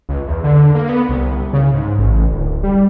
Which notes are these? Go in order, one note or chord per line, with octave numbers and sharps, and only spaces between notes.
C#2
E2
D3
A#3
B3
C2
C#3
G#2
A1
D1
G3